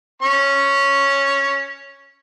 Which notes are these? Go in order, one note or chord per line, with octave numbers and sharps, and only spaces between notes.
C#4 C#6